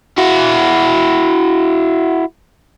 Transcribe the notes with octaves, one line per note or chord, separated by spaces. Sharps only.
E4 F#4